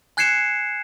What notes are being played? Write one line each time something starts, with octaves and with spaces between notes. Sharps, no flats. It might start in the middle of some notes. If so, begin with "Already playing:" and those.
G#5 F#6 G#6 C7 C#7 E7